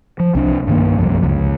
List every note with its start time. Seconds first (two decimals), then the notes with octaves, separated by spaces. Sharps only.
0.20 F3
0.35 C2 D4
0.67 G2 D#3 A#3
0.98 C2 F#2 F3
1.24 C#2